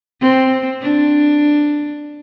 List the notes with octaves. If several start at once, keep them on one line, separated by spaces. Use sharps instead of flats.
C4
D4